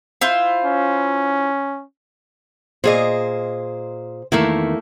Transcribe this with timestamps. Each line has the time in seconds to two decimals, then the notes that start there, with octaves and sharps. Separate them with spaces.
0.21 E4 F4 C5
0.65 C#4
2.84 A#2 G#4 C5 D#5
4.32 E2 D#3 A3 A#3 E4